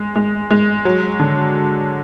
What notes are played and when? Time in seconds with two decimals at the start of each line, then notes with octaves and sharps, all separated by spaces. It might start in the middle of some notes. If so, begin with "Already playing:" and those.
Already playing: G#3
0.16 G#3
0.50 G#3
0.85 F#3
1.19 D3